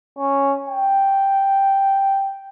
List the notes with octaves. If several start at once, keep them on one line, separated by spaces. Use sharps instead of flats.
C#4
G5